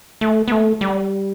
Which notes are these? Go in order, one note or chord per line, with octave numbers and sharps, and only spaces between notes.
A3
B3
A3
G3